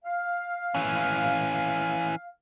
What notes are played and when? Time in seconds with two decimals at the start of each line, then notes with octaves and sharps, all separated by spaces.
0.04 F5
0.75 E3 C#4